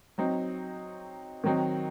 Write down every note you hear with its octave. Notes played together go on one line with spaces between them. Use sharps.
F#3 C4 D#4
D#3 F#3 C4 D#4